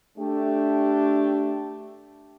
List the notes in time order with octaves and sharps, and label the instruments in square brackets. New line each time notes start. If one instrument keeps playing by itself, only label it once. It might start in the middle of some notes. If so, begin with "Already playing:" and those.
[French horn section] A3 D4 G4